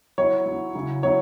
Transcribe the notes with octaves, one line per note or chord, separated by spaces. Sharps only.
F#3 E4 C#5
F#3
E4
C#3 F#3 E4
C#3 F#3 E4 C#5